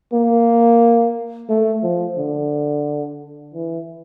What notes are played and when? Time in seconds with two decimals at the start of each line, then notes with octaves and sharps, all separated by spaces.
0.13 A#3
1.49 A3
1.83 F3
2.17 D3
3.54 E3